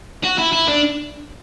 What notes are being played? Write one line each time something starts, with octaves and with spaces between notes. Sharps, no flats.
F#4
E4
E4
D4